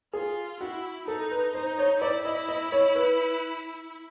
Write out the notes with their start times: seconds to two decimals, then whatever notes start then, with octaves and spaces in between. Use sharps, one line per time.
0.13 F4 G#4
0.60 E4 F#4
1.08 D#4 A4
1.31 B4
1.55 D#4 C5
1.78 C#5
2.01 E4 D5
2.25 D#5
2.48 D#5
2.72 C#5
2.95 B4